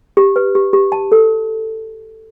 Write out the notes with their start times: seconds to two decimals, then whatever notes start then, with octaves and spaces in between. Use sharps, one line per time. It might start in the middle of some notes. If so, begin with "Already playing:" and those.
0.17 G4
0.36 B4
0.55 G4
0.73 G4
0.92 A5
1.12 A4